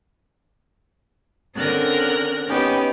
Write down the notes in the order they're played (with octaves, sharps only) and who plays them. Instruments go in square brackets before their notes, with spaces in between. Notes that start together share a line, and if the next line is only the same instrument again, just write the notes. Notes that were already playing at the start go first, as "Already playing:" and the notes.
[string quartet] D3 C4 C#4 A#4 F#6 A#6
B3 C#4 D#4 G4 B4